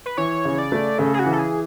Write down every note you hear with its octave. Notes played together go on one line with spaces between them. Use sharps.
B4
E3 C#5
C#3
D5
A3
C#3 A4
G#4
F#4
E3
A4
G#4